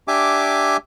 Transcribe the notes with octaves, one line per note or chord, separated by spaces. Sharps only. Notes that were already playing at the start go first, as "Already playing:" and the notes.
D4 G4 E5 G#5 D6